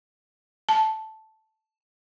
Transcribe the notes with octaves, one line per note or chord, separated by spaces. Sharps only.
A5